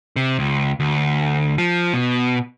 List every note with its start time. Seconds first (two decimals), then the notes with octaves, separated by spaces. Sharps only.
0.16 C3
0.39 C#2
0.80 D2
1.58 F3
1.93 B2